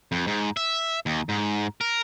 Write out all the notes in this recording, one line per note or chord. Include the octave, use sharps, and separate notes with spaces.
F2
G#2
E5
D#2
G#2
A#4